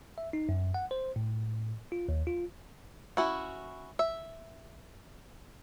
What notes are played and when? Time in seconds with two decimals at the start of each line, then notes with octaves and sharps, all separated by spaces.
0.18 E5
0.33 D#4
0.49 F#2
0.74 F#5
0.91 C5
1.16 A2
1.92 F4
2.09 D#2
2.27 F4
3.17 C#4 E4 F#4
3.99 E5